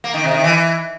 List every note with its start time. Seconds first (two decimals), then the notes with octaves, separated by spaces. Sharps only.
0.04 A#3
0.14 D#3
0.24 C3
0.34 D#3
0.44 E3